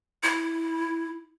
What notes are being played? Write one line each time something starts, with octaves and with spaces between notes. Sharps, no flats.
E4